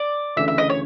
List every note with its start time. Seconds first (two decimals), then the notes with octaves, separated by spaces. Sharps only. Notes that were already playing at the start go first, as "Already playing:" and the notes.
Already playing: D5
0.37 D2 C#3 E3 E5
0.48 E5
0.58 D#5
0.70 C#5